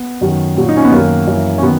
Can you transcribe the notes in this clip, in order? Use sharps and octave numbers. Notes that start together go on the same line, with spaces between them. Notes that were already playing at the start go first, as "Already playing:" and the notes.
Already playing: B3
F#2 D#3 F#3
A#2 F#3
D#4
C#4
B3
F#2 D#3 F#3 A#3
F#2 E3
C#4
D#3 F#3 B3